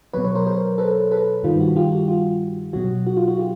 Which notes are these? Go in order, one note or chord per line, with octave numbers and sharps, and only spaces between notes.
B2 F#3 B4 C#5
B4 C#5
A#4 C5
A#4 C5
A4 B4
A4 B4
G2 D#3 G3 F4
F#4
F4 G4
F#4
F4
B2 F#3 F#4
F#4
F4
F#4
F4 G4